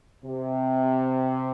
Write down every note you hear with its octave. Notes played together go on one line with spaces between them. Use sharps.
C3